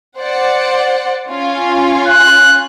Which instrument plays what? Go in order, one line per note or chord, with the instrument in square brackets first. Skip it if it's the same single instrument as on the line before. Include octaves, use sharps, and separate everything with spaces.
[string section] C5 D5 F#5
C#4 F4 G#5
[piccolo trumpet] F#6